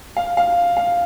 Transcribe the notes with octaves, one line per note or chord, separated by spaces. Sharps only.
F5
F5
F5